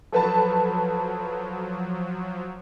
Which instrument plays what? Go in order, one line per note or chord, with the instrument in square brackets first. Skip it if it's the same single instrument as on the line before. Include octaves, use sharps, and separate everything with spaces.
[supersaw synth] F3 F#3 [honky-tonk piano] A4 B4 A5